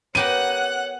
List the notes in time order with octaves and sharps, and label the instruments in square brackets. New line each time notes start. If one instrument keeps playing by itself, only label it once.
[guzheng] B3 G4 A#4 [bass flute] C#5 [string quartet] F#5 F#6 [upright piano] D#7